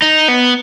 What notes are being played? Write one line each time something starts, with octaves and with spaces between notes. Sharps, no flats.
D#4
B3